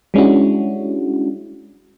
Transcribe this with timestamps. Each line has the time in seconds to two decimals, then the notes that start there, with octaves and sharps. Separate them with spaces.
0.14 G3 G#3 C#4 D4 E4 F#4